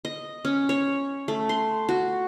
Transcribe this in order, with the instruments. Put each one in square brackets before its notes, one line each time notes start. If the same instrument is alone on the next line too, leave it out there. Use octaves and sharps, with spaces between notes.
[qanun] D#5
C#4
C#5
A3
C6
F#4